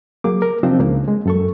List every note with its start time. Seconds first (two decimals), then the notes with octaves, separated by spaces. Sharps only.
0.24 F#3 A#3 G#4 D6
0.42 A#4
0.63 C3 F3 C4 D4 D#4 C5
0.80 C#2 C#3 A#3
1.08 G#3
1.26 F#2 A4 C#6